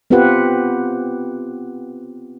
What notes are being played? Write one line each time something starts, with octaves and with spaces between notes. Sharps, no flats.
B3 C4 F4 G4 B4 F#5